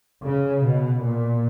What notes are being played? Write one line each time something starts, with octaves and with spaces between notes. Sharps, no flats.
C#3
B2
A#2